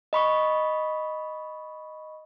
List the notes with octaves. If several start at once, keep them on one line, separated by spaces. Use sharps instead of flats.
D#5 B5 C#6